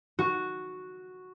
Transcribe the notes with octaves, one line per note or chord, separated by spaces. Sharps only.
F#4